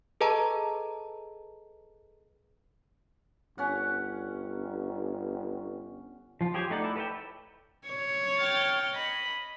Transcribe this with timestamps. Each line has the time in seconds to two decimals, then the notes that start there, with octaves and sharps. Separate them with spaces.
0.21 G#4 A4 B4 D#5 A5 A#5
3.58 G1 C#4 F#5
6.41 F3 F4
6.54 G4 G#4 C5 C#5
6.70 A3 D#4 D5 F#5
6.84 E4
6.96 A4 B4 C#5 E5 G5
7.88 C#5
8.39 G5 F6 A6
8.94 D#5 B5